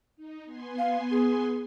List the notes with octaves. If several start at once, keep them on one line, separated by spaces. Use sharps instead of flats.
D#4
B3 G#5 C6
F5
G#4